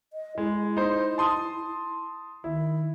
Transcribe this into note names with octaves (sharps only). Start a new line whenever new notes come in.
D#5
G#3 E4
D#4 C5
A5 C6 D#6
D#3 E4